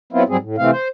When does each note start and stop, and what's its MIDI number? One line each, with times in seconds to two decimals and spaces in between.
0.13 0.23 54
0.13 0.23 59
0.13 0.23 60
0.13 0.23 64
0.13 0.23 65
0.29 0.37 44
0.29 0.37 54
0.29 0.37 55
0.29 0.37 60
0.29 0.37 68
0.41 0.56 45
0.58 0.71 48
0.58 0.71 52
0.58 0.71 57
0.58 0.71 60
0.58 0.71 77
0.72 0.88 72